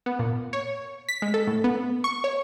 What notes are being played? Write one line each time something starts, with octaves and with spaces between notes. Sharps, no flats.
B3
A#2
C#5
B6
G#3
A4
A2
B3
C#6
C#5